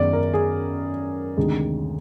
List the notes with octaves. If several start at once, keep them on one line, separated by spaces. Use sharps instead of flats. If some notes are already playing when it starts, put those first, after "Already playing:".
Already playing: F#2 D#3 G#3 B3 D5
A#4
G#4
D2 C3 D#3 G#3